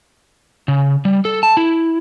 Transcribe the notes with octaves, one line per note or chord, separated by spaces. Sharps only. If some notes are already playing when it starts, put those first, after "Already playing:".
C#3
G3
A4
A5
E4